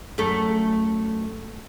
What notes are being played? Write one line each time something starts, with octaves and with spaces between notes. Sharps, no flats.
F#2 A3 A4